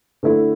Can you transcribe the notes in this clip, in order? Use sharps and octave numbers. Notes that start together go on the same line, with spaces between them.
D3 A3 E4